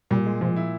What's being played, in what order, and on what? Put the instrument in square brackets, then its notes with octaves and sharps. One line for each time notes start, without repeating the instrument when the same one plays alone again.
[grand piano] A#2 [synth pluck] G3
[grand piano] G#3
[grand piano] A#2 [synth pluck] F3
[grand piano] E4